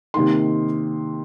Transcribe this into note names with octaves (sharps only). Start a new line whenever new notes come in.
C3 D#3 A#3 D#4 C6